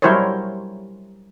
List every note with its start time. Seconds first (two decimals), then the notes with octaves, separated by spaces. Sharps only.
0.02 F#3 G3 E4 A#4 C5 C#5